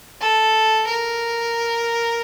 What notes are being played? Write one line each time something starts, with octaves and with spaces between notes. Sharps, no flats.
A4
A#4